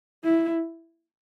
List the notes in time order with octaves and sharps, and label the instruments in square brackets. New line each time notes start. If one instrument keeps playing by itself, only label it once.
[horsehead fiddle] E4